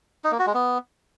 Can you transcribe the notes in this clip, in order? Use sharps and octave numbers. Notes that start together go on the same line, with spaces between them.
D#4
A#3
F#4
G#3
B3